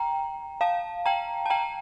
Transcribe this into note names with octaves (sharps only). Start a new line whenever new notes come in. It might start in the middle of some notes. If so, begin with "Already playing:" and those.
Already playing: G5 A#5
F5 A5
G5 A#5
A5
G5 A#5